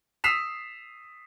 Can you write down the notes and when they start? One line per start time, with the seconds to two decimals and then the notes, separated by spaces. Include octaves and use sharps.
0.24 D#6 E6 B6 C7 E7 F7